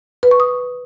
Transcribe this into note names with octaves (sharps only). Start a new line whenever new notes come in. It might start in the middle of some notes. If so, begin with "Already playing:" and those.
B4
C#6
D#6